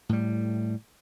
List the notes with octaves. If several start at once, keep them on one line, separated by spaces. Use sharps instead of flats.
A2 G3